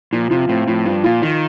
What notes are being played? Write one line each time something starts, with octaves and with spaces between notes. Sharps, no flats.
A#2 F3
C3 F4
A2 C4
A2 F3
G2 F3
A#2 F4
D#3 F4